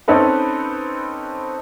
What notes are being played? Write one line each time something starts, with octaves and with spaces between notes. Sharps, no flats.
C4 C#4 D#4 A4 B4